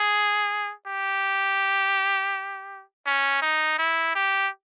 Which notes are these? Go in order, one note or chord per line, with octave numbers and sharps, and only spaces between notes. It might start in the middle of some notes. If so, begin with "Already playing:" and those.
Already playing: G#4
G4
C#4
D#4
E4
G4